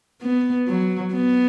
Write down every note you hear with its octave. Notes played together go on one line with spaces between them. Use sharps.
B3
F#3
B3